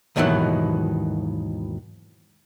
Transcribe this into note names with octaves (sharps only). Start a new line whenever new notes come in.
D#2 G#2 B2 D#3 E3 F#3